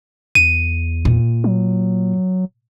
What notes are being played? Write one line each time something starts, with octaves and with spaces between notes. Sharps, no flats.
E2 D#7
A#2
F#3